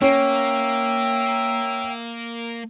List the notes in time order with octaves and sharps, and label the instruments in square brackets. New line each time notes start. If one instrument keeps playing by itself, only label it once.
[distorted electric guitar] A#3 [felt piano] C#4 [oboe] E5 [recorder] G5